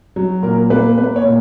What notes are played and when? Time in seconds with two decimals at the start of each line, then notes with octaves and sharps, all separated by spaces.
0.16 F#3
0.43 A#2 A#4
0.70 A#3 B4
0.98 A#3 B4
1.16 C#5
1.25 A#2